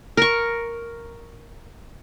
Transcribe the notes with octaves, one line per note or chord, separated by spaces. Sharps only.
A#4 C#6